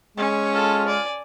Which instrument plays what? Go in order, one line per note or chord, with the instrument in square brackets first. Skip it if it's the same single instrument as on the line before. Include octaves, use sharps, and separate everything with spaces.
[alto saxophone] G#3 [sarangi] C#4
[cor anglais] F4 [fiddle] A4
[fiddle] D5 G#5